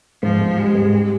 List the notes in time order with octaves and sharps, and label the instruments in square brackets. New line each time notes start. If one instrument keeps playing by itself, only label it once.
[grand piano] G#2 [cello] F3
[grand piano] G#2
[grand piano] G3 [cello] G#3
[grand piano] G#2
G4